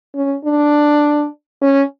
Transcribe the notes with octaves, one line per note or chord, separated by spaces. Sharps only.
C#4
D4
C#4